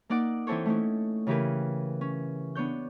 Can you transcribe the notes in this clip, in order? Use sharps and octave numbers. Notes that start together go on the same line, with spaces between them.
A#3 D#4 D5 F#5 D6
E3 C4 E4 A4 C5 C#5
A3 C#4 D#4 E4
C#3 E3 G4 A#4 B4
C#4
B3 D4 C#5 G6